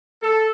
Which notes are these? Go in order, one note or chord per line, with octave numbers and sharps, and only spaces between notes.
A4